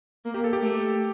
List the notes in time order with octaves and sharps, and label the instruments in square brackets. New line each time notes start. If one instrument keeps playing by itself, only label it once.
[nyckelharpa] A#3
[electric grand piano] G4
A4
G4
[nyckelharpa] A3